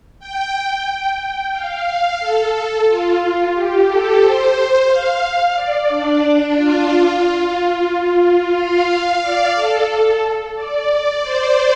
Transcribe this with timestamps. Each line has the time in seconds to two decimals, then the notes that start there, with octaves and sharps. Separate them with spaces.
0.20 G5
0.86 G5
1.21 G5
1.53 F5
2.20 A4
2.87 F4
3.54 G4
3.87 A4
4.21 C5
4.88 F5
5.55 D5
5.88 D4
6.55 F4
6.88 F4
8.22 F4
8.55 F5
9.21 D5
9.55 A4
10.55 D5
11.22 C5